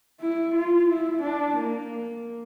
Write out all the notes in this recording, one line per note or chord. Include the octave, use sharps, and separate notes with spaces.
E4
F4
E4
D4
A#3